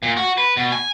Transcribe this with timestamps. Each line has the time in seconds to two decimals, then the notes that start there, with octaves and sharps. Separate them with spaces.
0.03 A#2
0.17 F#4
0.38 B4
0.57 B2
0.72 G#5